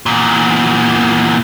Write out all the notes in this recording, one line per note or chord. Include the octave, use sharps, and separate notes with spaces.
E2 A#2